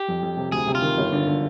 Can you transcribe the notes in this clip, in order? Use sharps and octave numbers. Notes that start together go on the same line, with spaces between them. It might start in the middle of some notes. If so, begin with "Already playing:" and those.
Already playing: G4
F2
F2
C3
D2 G#4
C3
F4
D#3
G1
D3
D3